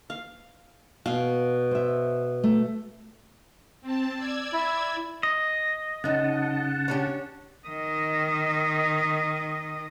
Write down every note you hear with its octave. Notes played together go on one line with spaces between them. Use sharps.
F5
B2 F5
C5 E5
A3
C4 A5
D5 E6 G#6
E4
D#5
F#2 C#3 D#4 F#5 A5
C#4 D4 G4
D#3 D#5